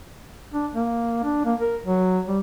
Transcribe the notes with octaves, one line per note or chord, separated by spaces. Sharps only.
D4
A#3
D4
A#3
A#4
F#3
G3